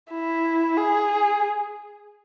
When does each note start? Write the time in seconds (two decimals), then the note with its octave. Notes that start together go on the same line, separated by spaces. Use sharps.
0.12 E4
0.77 G#4